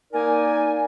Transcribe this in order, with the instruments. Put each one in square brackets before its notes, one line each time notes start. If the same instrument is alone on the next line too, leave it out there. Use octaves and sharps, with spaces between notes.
[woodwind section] A#3 D#4 A#4 D5 G#5